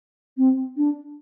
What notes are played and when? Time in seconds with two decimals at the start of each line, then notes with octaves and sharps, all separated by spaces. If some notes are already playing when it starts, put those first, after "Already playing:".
0.37 C4
0.76 D4